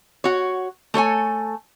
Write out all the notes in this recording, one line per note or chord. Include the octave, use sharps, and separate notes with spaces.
F#4 C#5
A3 A4 C#5 G#5